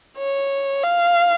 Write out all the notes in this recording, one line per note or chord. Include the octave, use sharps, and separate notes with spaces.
C#5
F5